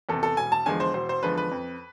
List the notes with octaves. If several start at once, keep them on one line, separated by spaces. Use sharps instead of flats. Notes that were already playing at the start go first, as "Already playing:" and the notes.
E2 C3 A4
A4
E1 G#5
A5
E2 D3 F3 G#3 G#5
C5
E1 C5
C5
E2 D3 F3 G#3 B4
B4
F2